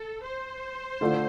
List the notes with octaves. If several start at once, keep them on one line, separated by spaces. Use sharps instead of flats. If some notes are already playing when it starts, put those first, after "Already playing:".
Already playing: A4
C5
D3 A3 F4